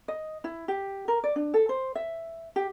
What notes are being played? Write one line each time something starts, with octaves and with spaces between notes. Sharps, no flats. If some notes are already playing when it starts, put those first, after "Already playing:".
D#5
E4
G4
A#4
D5
D4
A4
C5
E5
G4